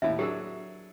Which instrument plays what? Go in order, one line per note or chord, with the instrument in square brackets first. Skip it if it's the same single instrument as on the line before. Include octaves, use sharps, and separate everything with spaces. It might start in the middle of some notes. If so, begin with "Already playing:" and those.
[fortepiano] D#2 A2 [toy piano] E5
[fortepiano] F#3 D4 G#4 [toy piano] G4 A#4